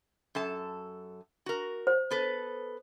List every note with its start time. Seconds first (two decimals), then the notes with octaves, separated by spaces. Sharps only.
0.35 F#2 A4 A5
1.46 F#4 A#4
1.87 C5
2.11 B3 A4 B4